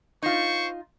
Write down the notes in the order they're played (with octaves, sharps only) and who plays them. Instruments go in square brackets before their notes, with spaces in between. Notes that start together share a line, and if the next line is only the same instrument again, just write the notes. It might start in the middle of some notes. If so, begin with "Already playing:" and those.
[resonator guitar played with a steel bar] D#4 F4 [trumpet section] C5 C#6